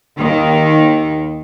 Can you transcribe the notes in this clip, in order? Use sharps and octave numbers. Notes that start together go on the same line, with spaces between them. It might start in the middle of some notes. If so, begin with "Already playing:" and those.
D#2 D#3